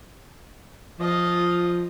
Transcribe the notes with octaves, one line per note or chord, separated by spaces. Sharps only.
F3 F4 D#5